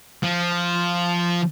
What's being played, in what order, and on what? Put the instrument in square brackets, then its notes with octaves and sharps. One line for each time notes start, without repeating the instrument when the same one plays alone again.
[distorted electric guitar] F3